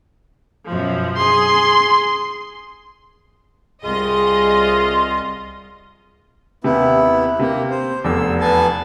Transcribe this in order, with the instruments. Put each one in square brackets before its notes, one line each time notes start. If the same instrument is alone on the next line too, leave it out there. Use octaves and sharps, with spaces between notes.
[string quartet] F#2 B2 F3
[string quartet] G#4 [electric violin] C6
[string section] C2 D#5 [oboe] F4 [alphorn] G#4
[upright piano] D#2 C3 [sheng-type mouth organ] B3 E4
[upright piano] C3 [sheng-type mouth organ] A#3
[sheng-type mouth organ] C5
[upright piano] F1 E2 [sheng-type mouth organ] E6
[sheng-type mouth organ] B3 G#5 A5